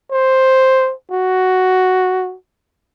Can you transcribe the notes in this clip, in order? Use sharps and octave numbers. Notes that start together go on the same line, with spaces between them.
C5
F#4